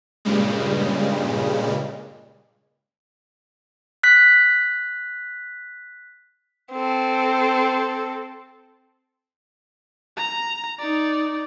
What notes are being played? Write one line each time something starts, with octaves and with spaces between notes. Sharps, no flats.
G2 A#2 C#3 G3 G#3
F#6 B6
C4 A4
A#5
D#4 D5